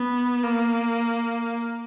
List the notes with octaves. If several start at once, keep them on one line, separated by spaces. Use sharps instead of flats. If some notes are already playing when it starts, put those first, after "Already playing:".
Already playing: B3
A#3